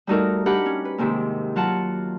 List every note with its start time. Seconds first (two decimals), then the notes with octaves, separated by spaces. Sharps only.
0.07 G3 A3 D#4 F#4 A4 A#4
0.46 D4 G4 A#4 F#5 B5
0.66 C#4
0.85 B4
0.98 D#2 G#2 C3 D#3
1.56 F#3 F4 F#5 A5